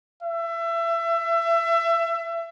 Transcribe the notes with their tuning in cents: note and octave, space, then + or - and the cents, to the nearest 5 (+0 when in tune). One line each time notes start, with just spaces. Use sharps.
E5 +25